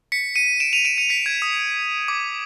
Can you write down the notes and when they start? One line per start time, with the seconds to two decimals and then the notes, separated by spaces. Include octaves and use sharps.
0.12 B6 C#7
0.36 C#7 D#7
0.60 D7 E7
0.73 D#7 F7
0.85 D7 E7
0.97 C#7 D#7
1.09 B6 C#7
1.26 G#6
1.42 D#6
2.08 D6